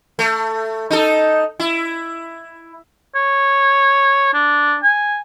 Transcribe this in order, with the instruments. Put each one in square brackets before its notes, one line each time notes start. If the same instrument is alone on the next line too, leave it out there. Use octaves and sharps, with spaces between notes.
[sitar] A3
D#4 A4
E4
[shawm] C#5
D4
G#5